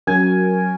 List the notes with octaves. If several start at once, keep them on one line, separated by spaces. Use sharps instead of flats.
F#3 C#4 F#4 A#4 G#5